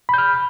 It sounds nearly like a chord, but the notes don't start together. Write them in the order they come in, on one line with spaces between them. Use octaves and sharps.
B5 G6 F6